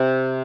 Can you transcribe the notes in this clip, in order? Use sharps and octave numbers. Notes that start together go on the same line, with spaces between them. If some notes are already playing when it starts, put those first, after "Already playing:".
Already playing: C3